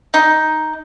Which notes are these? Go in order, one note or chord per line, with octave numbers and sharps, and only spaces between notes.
D#4